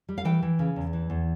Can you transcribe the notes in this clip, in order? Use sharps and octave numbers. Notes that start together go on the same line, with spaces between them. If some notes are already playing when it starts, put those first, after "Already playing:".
G3
F5
E3 G5
E3
C#3
E2
E3
E2